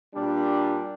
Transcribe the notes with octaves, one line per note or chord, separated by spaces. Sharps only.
A#2 G3 D4